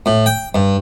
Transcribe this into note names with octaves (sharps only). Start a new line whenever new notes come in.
A2
G5
G2